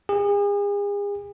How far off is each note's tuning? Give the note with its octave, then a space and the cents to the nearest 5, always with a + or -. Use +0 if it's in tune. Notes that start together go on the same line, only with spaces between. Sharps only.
G#4 -40